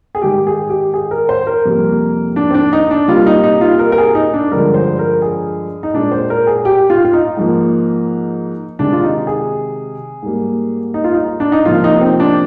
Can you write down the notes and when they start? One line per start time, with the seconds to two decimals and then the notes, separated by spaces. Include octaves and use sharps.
0.15 G#4
0.22 G#2 D#3 G#3 G4
0.47 G#4
0.69 G4
0.94 G#4
1.11 A#4
1.29 C5
1.47 A#4
1.65 F2 C3 G3 A#3
2.36 D4
2.51 C4
2.54 D4
2.73 D#4
2.91 D4
3.08 C3 G3 A#3 F4
3.27 D#4
3.44 D#4
3.61 F4
3.79 A#4
3.92 A#4
3.98 G#4
4.15 D#4
4.34 D4
4.51 G2 D3 F3 G#3 A#4
4.74 C5
4.99 A#4
5.22 G#4
5.83 D#4
5.93 A#2 G#3 D4
6.12 C5
6.30 A#4
6.47 G#4
6.65 G4
6.90 F4
7.05 F4
7.13 D#4
7.37 G#2 F3 A#3
8.79 C3 D#3 G#3 D4
8.93 F4
9.04 D#4
9.27 G#4
10.22 G#2 G3 A#3
10.94 D#4
11.04 F4
11.14 D#4
11.40 D4
11.52 D#4
11.65 C3 F3 A#3 F4
11.84 D#4
12.01 C4
12.20 D4